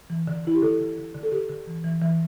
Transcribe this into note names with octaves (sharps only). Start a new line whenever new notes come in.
E3
D3
D3 E4
G4
D3 A4
D3
D3
D3
A4
D3 G4
D3
E3
E3
E3